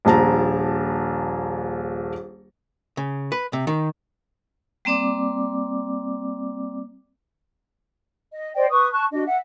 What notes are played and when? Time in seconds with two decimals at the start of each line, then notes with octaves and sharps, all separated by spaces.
0.05 D#1 A#1 A5 A#5
2.97 C#3
3.32 B4
3.53 C3
3.67 D#3
4.85 G3 A#3 C4 D5 D6
8.33 D#5
8.54 C5 D5 D#5 G5
8.70 B4 C#6 D#6
8.92 A5 C#6 F#6
9.12 D4 F#4 D#5
9.25 E5 F#5